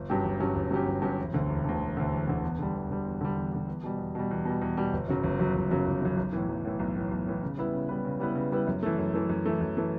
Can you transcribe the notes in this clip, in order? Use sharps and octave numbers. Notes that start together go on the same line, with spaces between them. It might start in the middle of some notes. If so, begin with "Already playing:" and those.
Already playing: G1
G2 F#3 C#4 G4
G1
G2 F#3 C#4 G4
G1
G2 F#3 C#4 G4
G1
G2 F#3 C#4 G4
E1
D2 D3
E1
D2 D3
E1
D2 D3
E1
D2 D3
E2
D3 G3
E2
D3 G3
E2
D3 G3
E2
D3 G3
E2
B2 G3
E2
B2 G3
E2
B2 G3
E2
B2 G3
G1
F#2 C#3 F#3
G1
F#2 C#3 F#3
G1
F#2 C#3 F#3
G1
F#2 C#3 F#3
B1
A2 E3
B1
A2 E3
B1
A2 E3
B1
A2 E3
C#3
G3 B3 E4 B4
C#3
G3 B3 E4 B4
C#3
G3 B3 E4 B4
C#3
G3 B3 E4 B4
F#2
E3 A3
F#2
E3 A3
F#2
E3 A3
F#2
E3 A3